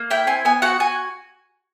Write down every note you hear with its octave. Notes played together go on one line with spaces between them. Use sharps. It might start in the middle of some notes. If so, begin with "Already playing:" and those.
Already playing: A#3
E4 G5
C4 G#5
B3 G#5
F#4 F#5
F#4 G#5